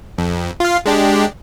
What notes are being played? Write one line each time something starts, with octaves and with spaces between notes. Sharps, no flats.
F2
F4 F5
G#3 D4 G4